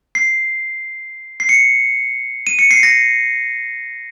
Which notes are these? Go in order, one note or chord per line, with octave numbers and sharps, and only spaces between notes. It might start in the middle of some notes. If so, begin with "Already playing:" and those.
C7
C7
C#7
D#7
C#7
C7
A#6